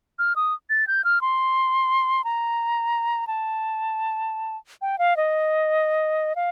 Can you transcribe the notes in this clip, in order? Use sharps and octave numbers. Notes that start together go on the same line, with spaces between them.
F6
D#6
A6
G6
F6
C6
A#5
A5
G5
F5
D#5
F5